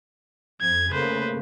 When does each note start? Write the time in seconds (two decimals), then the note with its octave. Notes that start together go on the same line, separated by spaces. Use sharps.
0.61 F2 G#6
0.90 C#3 A3 A#3 B4 C5